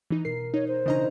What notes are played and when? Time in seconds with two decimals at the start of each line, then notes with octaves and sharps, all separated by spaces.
0.10 E3 D#4
0.25 B2 A#4 C7
0.54 D#4 C#5
0.68 C5
0.86 C#3 E3 D4 D#4 D#5 A#5